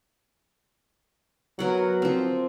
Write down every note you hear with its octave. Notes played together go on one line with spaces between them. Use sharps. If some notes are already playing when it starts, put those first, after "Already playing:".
F#3 B3 A#4 F#5
F3 C4